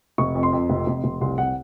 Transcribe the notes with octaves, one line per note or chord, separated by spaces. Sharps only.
F1 C#6
F2
C6
F2
F1
F1
F1
C2 C6
C2 F#5